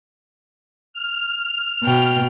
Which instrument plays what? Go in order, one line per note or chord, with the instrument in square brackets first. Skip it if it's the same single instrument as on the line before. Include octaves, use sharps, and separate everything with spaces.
[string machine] F6
[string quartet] B2 G5